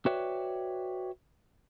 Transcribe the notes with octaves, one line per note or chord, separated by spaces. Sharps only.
F#4 B4 C#5 D5 E5 G5